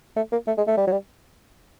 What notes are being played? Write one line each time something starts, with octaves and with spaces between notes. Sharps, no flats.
A3
A#3
A3
G#3
A3
G3
F#3
G3